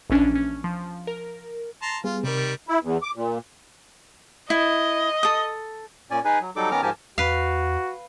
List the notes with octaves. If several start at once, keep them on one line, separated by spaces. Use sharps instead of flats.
A#1 E3 C#4 D4
C#4
F3
A#4
A5 A#5 C6
G3 B3 F4 G#4
C3 D#3 G3 A#4
E4
E2
D6
A#2
E4 D#5
A4 D#6
A#2 C#4 D5 G#5
D#4 G#4 B4 G#5
F#3
F#3 G3 D#4 A4 D6
D#3 B3 C#4 A#5 D6 F6
G#2 F3 G4 A#4 G#5 A5
E2 F#4 B4 F5